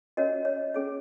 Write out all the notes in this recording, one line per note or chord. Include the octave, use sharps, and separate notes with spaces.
C#4 F#4 A#4 C#5 D#5
C#5
C#4 G#4 C#5